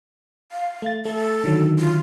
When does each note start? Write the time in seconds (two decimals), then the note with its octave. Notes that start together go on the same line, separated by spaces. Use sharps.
0.52 F5
0.82 A3 A6
1.05 A3 A4
1.44 D3 D#3 F#3
1.79 F4